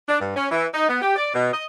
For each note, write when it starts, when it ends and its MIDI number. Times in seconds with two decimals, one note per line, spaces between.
0.08 0.19 62
0.20 0.35 43
0.35 0.48 61
0.51 0.66 52
0.73 0.88 63
0.89 1.01 59
1.02 1.16 67
1.16 1.30 74
1.34 1.52 47
1.53 1.64 75